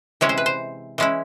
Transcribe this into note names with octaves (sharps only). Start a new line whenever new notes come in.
C3 E3 G#3 C#4 E4 C#5
C5
B4
C5
E3 G#3 C#4 E4